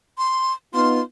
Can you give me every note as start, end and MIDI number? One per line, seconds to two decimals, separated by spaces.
0.18 0.53 84
0.74 1.01 59
0.74 1.01 63
0.74 1.01 65
0.74 1.01 84